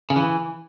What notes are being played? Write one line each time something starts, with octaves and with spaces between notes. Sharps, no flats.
C#3
E3